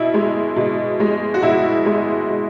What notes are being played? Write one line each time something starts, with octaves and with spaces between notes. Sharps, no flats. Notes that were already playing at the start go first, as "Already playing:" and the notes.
Already playing: B2 E4
G#3
B2
G#3
F#4
B2 E4
G#3
B2